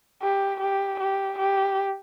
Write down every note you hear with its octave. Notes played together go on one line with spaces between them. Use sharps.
G4
G4
G4
G4